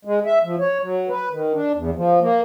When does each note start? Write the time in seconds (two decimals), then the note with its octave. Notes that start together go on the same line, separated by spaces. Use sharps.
0.05 G#3
0.26 E5
0.44 F3
0.60 C#5
0.81 F#3
1.09 B4
1.31 D#3
1.53 D4
1.75 E2
1.96 F3
2.21 A#3